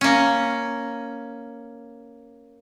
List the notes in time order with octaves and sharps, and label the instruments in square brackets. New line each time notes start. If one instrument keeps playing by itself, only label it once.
[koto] A#3 C#4